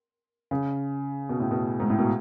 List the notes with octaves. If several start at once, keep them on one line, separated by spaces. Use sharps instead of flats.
C#3
B2
A2
B2
G#2
A2
B2